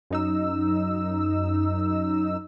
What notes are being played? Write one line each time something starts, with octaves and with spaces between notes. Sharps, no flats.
F#2 D#4 E6